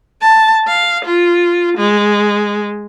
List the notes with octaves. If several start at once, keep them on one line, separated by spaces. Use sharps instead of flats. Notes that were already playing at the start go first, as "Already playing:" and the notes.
A5
F5
F4
G#3